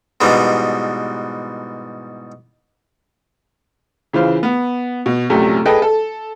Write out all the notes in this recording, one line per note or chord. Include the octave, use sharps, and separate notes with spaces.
G#2 B2 E3 G3
C#3 E3 F4 C5
B3
B2
A#1 F#2 C3 G3 A3
G#4 A4 B4 D#5 G5
A4